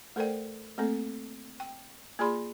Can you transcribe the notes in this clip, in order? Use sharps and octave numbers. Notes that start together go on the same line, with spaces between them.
A3 A4 A#4 C5 D5 G5
A3 A#3 C4 A4
G5
A#3 F4 G#4 D5 B5 C6